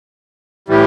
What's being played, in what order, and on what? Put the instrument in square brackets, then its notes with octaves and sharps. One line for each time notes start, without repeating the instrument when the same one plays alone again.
[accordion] A2 E3 G3